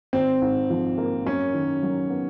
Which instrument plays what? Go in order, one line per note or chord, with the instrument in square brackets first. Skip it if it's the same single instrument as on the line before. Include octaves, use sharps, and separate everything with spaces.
[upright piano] G#1 [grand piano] C4
[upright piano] G#2
F3
A#3
[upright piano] F#2 [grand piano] C#4
[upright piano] D#3
F#3
B3